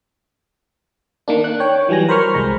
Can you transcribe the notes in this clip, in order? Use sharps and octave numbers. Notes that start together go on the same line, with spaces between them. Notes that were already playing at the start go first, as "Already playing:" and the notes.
D#3 A#3 D4
F#6
C#5 G5
E3 F#3 G3 G#5 A#6
A#4 C5 B5 C#6 F6
C2 G#3 A#5